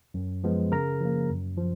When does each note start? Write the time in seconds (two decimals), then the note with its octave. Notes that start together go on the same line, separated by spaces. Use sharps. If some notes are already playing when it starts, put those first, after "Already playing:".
0.14 F#2
0.44 F3 G#3 B3
0.72 C#3 A#4 A#5
1.01 F3 A#3
1.30 F#2
1.57 F3